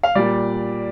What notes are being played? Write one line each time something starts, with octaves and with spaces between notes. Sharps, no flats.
F5
A#2 G3 D5